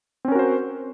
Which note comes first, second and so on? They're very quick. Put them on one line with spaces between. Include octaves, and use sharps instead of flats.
C4 C#4 A#4 F#4 C5